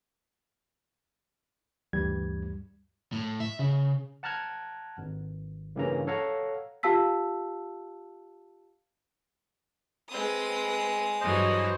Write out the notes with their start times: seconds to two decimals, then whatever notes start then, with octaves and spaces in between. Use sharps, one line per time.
1.93 D2 G2 E3 G3 G#6
3.12 A2
3.40 E5
3.59 C#3
4.23 F#5 A5 A#5 F6 F#6 G#6
4.98 G#1
5.76 G2 C#3 E3 A#3 C#4 A#5
6.07 A4 C#5 F5 F#5 A#5
6.83 F4 G4 F5 A5 E6 B6
10.09 G#3 C4 B4 D#6
11.21 G2 E3 F#3 C5 D#5